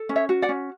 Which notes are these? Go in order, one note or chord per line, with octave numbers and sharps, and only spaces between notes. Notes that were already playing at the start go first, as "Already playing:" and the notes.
Already playing: A4
C#4
C#5 E5
F#4
D5 F#5
C#4